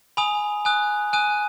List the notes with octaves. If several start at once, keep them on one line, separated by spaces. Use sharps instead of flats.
G#5 B5 D#6 F7
G#5 D#6 F#6
G#5 D#6 F#6 D#7